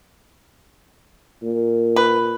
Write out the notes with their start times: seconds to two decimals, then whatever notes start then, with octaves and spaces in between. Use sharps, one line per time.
1.42 A#2
1.96 B4